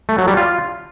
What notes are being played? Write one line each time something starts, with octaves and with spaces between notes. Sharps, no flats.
A3
F#3
G3
F4